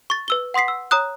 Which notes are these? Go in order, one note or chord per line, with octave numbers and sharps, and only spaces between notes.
C#6 A6
B4 E6 G7
F#5 C6 D#6 B6 C7
E6
C#5 A#5 D#6 F#6